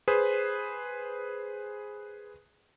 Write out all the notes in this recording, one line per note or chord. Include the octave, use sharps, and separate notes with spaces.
G#4 B4 C5